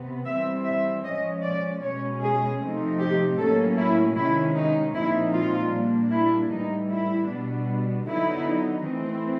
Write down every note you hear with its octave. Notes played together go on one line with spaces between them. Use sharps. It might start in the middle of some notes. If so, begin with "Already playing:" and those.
Already playing: C3 B3
E3 G3 C4 E5
E5
F3 G#3 C#4 D#5
D5
B2 G#3 C#4 C#5
G#4
C3 F3 A3 C4 D#4
G4
A2 F#3 A#3 C#4 A4
E4
C3 D#3 G#3 C#4 E4
D#4
A#2 F3 G#3 C4 D#4 E4
F4
A#2 G3 A#3 D4
E4
A2 E3 G3 D#4
E4
B2 G3 B3 D4
D3 F#3 B3 D#4 E4
E3 A3 C4